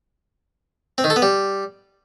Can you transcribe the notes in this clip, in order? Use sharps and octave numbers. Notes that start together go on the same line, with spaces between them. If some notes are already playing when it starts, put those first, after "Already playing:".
C4
D#3
A4
B3
G3